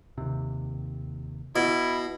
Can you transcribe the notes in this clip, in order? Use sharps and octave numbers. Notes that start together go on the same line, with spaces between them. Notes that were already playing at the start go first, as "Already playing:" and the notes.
D#2 C3
B2 E4